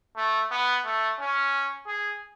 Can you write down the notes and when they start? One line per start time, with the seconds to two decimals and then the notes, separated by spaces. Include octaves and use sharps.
0.16 A3
0.51 B3
0.85 A3
1.19 C#4
1.87 G#4